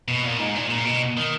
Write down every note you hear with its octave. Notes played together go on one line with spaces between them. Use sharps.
B2
A#2
G#2
A#2
A#2
B2
D#3